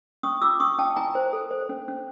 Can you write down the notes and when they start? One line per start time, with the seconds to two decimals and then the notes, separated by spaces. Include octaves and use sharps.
0.23 C#4 C#6 D#6
0.42 F4 D6 E6
0.60 C#4 C#6 D#6
0.78 C#4 G5 A5
0.96 E4 G#5 A#5
1.15 C5
1.33 A4
1.51 C5
1.69 C#4
1.88 C#4